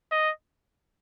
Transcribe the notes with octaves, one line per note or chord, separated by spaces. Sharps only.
D#5